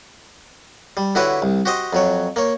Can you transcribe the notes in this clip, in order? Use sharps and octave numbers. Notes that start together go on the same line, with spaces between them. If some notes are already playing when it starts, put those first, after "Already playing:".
G3
D3 E4 F#4 G4 B4 C#5
C2
F#4 G4 C5 D#5
F2 F#3 C#5
A#3 C#5